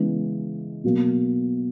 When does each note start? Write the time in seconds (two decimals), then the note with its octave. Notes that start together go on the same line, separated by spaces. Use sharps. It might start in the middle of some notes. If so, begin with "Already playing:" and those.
Already playing: C#3 E3 G#3 B3
0.84 B2 F#3 A#3